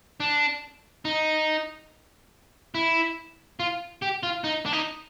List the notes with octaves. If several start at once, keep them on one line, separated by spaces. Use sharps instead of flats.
D4
D#4
E4
F4
G4
F4
D#4
D4
D#4